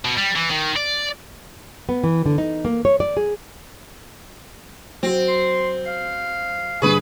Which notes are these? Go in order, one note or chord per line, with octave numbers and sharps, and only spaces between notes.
B2
G3
E3
D#3
D5
B3
E3
D3
D#4
A#3
C#5
D5
G#4
F#3 C4 F#4
C6
F5
G2 D3 G#4 B4 C#6